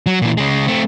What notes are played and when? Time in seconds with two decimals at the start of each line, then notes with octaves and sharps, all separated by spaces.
0.06 F#3
0.22 A#2 E3
0.37 C#3 G#3
0.68 A3 C4